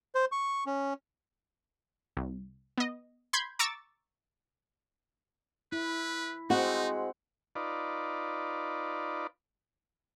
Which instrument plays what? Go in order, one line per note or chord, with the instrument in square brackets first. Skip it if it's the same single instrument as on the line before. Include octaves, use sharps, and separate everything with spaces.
[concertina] C5
C#6
C#4
[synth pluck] C2
B3 D#5
B5 C6 G6 G#6
A#5 C#6 D6 E6 A6
[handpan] E4 [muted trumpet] B4
[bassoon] G#3 [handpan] C4 F#5 [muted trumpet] D#4 [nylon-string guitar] F#4
[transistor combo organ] D#4 F4 B4 D5